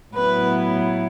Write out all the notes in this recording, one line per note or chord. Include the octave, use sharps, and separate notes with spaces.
A2 F#3 B3 E4 B4